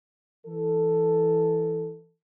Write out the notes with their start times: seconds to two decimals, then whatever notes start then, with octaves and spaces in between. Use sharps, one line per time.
0.46 E3 A4